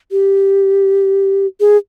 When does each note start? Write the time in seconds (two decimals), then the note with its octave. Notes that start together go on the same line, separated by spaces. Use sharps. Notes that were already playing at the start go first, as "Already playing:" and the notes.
0.11 G4
1.60 G#4